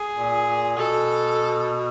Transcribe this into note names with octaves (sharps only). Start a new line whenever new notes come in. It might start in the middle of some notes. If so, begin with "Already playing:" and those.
Already playing: G#4
A#2
A#2
B2 A4